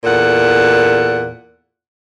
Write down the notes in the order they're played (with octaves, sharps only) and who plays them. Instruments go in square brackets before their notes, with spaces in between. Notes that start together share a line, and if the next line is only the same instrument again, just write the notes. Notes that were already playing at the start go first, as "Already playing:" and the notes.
[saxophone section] E2 A#2 A4 F#5